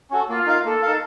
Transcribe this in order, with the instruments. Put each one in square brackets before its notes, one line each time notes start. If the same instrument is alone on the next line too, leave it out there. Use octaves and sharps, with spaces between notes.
[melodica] C#4 F#4 A4
[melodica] A#3 [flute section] F4
[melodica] D#4 A#4 F5
[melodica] A#3 [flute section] A4
[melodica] D#4 A#4 F5